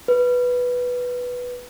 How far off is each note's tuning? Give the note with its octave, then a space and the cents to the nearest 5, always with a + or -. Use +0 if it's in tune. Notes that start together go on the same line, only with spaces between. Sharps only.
B4 -5